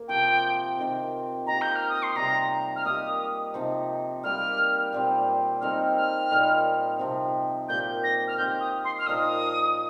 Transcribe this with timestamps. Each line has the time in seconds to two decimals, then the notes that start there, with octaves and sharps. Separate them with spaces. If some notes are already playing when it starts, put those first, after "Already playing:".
Already playing: A#3
0.08 C3 F3 C4 F4 G5
0.77 C3 D#3 C4 F4
1.47 A#3 G4 D#5 A#5
1.62 G6
1.75 F6
1.89 D#6
2.03 C6
2.16 C3 G3 C4 D#4 A#5
2.76 F6
2.85 A#3 D#4 G4 D#6
3.54 C3 F3 D#4
4.23 G3 A#3 G4 F6
4.93 A#2 G3 C4
5.61 G3 C4 D#4 A#4 F6
5.97 F6
6.31 A#2 G3 D#4 C5
6.99 C3 F3 C4
7.69 A#2 A#3 G4 G6
8.04 A#6
8.28 F6
8.38 D#3 C4 G4 G6
8.61 D#6
8.85 C6
8.99 F6
9.07 A#2 F3 D#4 A#4 D#6